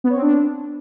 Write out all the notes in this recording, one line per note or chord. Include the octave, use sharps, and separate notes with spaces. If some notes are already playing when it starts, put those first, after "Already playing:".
B3
C#5
C4
D4